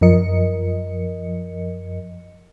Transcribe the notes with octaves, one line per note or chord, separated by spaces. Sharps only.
F#2 F3 A#4 D#5 C#7